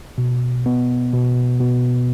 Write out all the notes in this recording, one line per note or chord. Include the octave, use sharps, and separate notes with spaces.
B2
B3
B2
B2